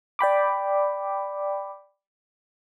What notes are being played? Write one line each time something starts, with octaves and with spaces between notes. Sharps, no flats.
D5 G5 B5 D6